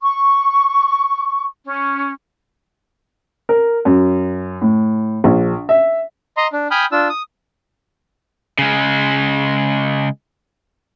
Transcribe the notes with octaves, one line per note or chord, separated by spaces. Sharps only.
C#6
C#4
A#4
F#2
A2
A#1
E5
D#5 A#5 C6
D4
G5 G#5 B5 D#6 F6 G6
D4 F4 E6
D#6
C#3 G#3